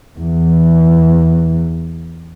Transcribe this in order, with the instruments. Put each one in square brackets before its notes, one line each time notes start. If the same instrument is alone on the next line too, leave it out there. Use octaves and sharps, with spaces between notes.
[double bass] E2 E3